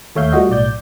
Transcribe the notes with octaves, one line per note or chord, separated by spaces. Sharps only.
D#2 A3 C#5 E5 F5 G6
G3 A3 F4 F#4 D#5
B1 A2 D5 G6